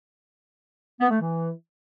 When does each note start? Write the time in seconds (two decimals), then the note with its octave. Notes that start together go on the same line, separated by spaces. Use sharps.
1.00 B3
1.10 A3
1.20 E3